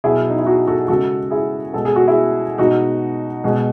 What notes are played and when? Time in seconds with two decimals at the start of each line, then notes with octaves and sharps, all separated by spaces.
0.04 B2 F#3 E4 G#4
0.30 D#4
0.38 E4
0.46 D#4 F#4
0.68 F#4 A4
0.88 C#3 G#3 F#4 A4
1.31 E4 G#4
1.73 B2 G#3 A4
1.85 G#4
1.96 F#4
2.07 E4 G#4
2.58 B2 G#3 D#4 F#4
3.44 B2 G#3